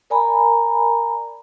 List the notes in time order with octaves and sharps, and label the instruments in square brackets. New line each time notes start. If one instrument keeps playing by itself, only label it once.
[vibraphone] A#4 D5 G#5 A#5 B5